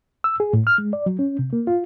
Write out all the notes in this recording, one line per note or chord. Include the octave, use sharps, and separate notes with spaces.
E6
G#4
A2
F6
G#3
D5
F#3
C#4
C3
A#3
F4